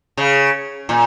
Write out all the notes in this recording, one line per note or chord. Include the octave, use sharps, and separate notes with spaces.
C#3
A#2